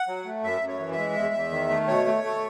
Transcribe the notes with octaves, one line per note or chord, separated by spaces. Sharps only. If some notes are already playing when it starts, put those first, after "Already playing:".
Already playing: F#5
F#3
A3
F#2 E5
F#2
C#5
E3
E5
G#3
E2
E2
D#3
A3
B2 C#5
A3
A3